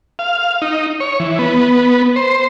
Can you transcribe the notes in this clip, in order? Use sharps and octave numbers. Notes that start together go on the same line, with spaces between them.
F5
D#4
C#5
E3
B3
C5